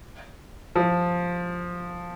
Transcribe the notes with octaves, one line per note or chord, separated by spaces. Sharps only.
F3